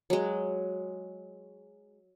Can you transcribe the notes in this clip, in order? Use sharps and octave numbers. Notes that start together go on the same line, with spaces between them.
F#3 G#3